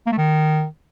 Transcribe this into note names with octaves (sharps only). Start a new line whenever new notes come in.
A#3
A3
D#3